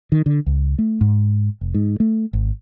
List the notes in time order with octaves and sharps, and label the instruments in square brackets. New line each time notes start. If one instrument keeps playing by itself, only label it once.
[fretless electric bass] D#3
D3
C#2
A3
G#2
F1
G#2
A3
G#1